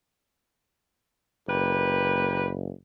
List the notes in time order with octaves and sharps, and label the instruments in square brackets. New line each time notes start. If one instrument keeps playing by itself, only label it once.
[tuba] F#1 [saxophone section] A#3 G4 B4